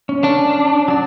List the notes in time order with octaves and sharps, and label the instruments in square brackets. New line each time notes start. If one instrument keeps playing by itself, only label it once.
[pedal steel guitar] C#4
[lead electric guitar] D4
[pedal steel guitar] F#3 D5